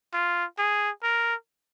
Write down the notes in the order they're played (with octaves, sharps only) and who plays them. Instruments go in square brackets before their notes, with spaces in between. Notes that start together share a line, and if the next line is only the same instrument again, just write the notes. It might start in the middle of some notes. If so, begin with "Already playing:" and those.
[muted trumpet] F4
G#4
A#4